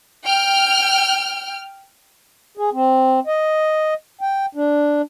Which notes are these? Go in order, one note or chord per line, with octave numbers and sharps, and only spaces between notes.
G5 F6
G#4
C4
D#5
G5
D4